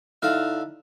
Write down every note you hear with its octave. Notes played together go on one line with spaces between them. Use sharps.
D3 D#4 E4 E5 F5 F#6